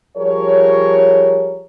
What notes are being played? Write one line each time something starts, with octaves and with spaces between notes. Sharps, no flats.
F3 G3 G#4 A#4 C#5